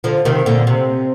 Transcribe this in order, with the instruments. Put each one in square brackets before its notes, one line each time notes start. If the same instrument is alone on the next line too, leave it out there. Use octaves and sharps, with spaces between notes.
[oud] D3 F3
C3 D#3
A#2 D3
C3